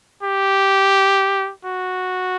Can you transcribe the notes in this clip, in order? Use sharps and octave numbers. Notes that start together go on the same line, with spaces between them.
G4
F#4